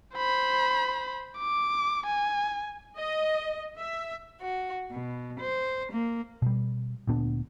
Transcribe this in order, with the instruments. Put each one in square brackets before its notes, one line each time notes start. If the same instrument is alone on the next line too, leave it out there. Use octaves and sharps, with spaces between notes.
[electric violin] C5 B5
D6
G#5
[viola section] D#5
E5
[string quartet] F#4
B2
C5
A#3
[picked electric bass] B2 G3
D2 A#2 B3 D4